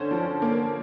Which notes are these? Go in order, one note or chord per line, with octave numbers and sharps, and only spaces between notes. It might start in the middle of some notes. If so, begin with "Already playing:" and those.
Already playing: D3 C#4 C5
F3
A#3